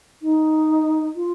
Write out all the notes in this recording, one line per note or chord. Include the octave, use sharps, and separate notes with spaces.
D#4
F4